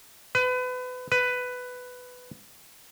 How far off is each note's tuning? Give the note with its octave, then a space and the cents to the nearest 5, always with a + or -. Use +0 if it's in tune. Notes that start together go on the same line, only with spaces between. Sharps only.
B4 +30
B4 +10